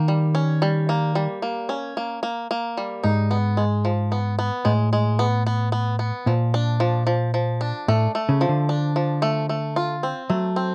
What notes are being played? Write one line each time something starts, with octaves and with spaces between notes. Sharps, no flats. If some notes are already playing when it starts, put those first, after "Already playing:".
Already playing: D#3 A#3
G3
C#4
G3
A#3
G3
A#3
C#4
A#3
A#3
A#3
G3
G#2 D#4
B3
G#3
F3
B3
B3
A2 G#3
G#3
B3
B3
B3
B3
A#2 F3
D4
F3
F3
F3
D4
A2 A3
A3
C#3
F3
D3
D4
F3
A3
A3
F4
C4
F#3 A3
C4